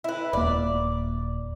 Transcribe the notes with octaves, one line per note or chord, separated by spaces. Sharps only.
E4 B4
D#1 A#3 D5